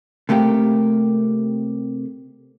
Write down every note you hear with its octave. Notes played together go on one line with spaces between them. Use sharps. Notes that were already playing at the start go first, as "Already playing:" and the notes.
C3 A3 A#3 G4